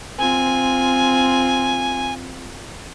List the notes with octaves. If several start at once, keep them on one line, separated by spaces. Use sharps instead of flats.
C4 F4 G#5